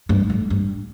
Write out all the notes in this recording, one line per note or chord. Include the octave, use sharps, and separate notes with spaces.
G2
A2
G2